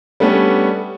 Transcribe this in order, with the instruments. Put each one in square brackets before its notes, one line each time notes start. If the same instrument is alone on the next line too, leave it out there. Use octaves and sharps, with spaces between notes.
[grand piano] G3 A3 B3 C#4 D4